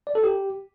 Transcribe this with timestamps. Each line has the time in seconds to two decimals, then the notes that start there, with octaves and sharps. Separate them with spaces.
0.07 D5
0.15 A4
0.24 G4